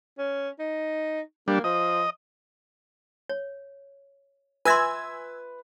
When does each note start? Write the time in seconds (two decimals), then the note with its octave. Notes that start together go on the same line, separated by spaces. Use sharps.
0.18 C#4
0.59 D#4
1.48 G3 A#3 D4
1.64 F3 D#5
3.29 C#5
4.65 F4 B4 E5 G#5 C6 E6 G#6